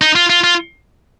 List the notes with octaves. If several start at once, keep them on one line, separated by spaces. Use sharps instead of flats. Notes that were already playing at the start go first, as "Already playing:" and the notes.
D#4
F4
F4
F4